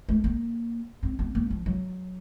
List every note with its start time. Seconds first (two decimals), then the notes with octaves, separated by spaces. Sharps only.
0.09 A3
0.24 A#3
1.03 C4
1.19 B3
1.35 A#3
1.50 F3
1.66 F#3